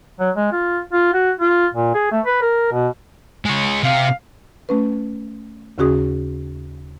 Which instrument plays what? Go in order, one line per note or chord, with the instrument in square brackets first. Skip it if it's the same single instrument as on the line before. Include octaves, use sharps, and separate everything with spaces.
[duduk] F#3
G#3
F4
F4
F#4
F4
A#2
G#4
A3
B4
A#4
B2
[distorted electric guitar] G#3 C#5
[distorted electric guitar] C3 [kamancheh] F5
[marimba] A3 C#4 B4
D#2 C#3 C#4 F#4 G#4 D#6